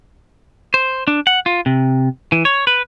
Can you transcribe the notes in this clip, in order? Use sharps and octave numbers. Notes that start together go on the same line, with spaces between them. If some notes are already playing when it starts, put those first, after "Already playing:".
C5
D4
F#5
F4
C3
E3
C#5
B4